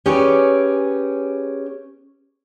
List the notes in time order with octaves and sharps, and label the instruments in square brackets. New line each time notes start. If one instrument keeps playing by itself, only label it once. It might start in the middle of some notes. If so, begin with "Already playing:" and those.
[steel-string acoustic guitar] C#4 G4 G#4 B4 C#5 D5